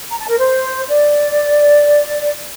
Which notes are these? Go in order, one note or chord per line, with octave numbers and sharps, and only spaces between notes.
A#5
A5
A#4
C5
D5